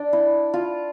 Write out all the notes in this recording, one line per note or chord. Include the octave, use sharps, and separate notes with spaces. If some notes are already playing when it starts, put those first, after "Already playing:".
Already playing: D4
E4
F4